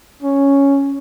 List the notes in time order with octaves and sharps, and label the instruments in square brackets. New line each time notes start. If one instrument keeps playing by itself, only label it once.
[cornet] C#4